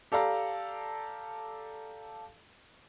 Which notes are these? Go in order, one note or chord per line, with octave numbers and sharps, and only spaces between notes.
G4 A4 D5 F5 A#5